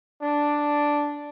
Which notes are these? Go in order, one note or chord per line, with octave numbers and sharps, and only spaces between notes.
D4